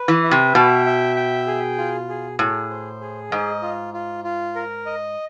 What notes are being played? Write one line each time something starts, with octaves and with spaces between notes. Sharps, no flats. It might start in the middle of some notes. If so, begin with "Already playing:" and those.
Already playing: B4
E3
E5
C3
B2 G5
E5
G5
G#4
F4
G#4
A2 G#4
C5
G#4
G#2 D#5
F4
F4
F4
A#4
D#5